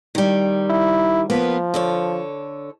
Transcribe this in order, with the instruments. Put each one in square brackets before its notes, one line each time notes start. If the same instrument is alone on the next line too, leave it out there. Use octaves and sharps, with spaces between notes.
[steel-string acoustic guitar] D#3 G3
[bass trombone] E4
[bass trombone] F3 [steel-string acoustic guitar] A#3 B3 B4
[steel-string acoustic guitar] D3 A4 C#5